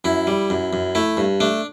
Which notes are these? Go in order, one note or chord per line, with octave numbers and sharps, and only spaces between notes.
F#2 E4
G3
F#2
F#2
A3 E4
G2
A3 D4